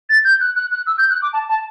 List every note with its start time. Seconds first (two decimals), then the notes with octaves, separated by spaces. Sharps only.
0.09 A6
0.25 G6
0.41 F#6
0.56 F#6
0.72 F#6
0.87 E6
0.98 G6
1.10 F#6
1.22 D6
1.33 A5
1.49 A5